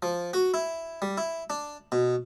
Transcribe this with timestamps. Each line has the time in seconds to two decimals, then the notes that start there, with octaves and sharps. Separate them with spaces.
0.02 F3
0.33 F#4
0.54 E4
1.02 G3
1.17 E4
1.50 D4
1.92 B2